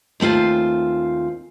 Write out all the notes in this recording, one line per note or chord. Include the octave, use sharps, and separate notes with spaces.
D#2 A3 C4 F4 G#5